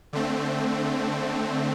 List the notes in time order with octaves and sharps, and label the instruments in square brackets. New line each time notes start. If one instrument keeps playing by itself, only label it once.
[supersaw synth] D3 A3 C4